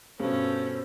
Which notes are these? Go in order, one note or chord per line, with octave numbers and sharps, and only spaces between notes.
G2 B2 C#4 A4 C5